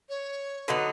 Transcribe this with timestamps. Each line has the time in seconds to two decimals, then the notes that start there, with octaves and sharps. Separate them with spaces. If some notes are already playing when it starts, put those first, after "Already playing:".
0.09 C#5
0.68 D3 F#3 B3 D#4